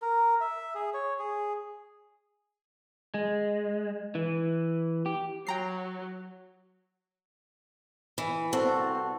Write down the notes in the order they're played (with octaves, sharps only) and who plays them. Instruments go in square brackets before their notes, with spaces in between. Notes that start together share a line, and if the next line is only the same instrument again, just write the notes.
[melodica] A#4
E5
G#4
C#5
G#4
[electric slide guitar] G#3
E3
G4
[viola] F#3 [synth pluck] G5 A#5 C7
[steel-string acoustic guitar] E3
[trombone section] C2 F#4 A4 [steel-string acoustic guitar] C4